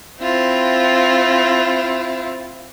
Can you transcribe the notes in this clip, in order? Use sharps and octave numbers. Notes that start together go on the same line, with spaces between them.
C4 E4 F4